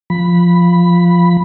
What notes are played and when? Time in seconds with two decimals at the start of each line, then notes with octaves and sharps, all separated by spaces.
0.10 F3 B5